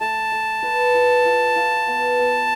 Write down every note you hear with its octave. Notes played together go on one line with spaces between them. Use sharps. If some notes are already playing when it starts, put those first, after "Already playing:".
A3 A5
A3
B4
F4
F4
F4
B3
B3